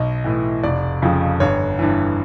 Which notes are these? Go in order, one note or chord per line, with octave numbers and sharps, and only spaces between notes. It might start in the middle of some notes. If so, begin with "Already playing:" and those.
Already playing: B1 D#5
A2 E3
F1 D5
F2 C#3 F3
G1 C#5
G2 E3